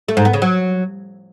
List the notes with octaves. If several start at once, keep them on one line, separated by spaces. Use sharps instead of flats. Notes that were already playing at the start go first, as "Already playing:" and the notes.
A3
G#2
B3
C#3
F#3